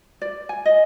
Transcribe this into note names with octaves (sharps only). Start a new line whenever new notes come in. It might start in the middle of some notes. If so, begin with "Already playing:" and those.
D5
G#5
D#5